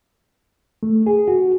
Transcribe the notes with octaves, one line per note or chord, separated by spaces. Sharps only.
A3
G#4
F#4